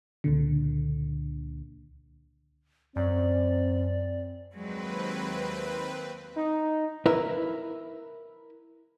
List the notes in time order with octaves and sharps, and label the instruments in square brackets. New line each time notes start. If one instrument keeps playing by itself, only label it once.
[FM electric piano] C#2 A#2 D3
[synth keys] F#2 [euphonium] C4 [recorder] D5
[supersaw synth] D#2 C4 B4 [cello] F#3 G#3
[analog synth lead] D#4
[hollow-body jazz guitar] E4 A#4 B4 E5